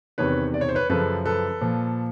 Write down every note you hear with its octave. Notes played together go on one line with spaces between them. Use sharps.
E2 C3 D#3 B4 C#5
D5
C#5
C5
B4 C#5
F#2 C#3 F3 A4 B4
A4 B4
A#2 F3